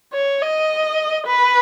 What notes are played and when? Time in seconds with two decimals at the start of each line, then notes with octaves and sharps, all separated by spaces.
0.13 C#5
0.42 D#5
1.26 B4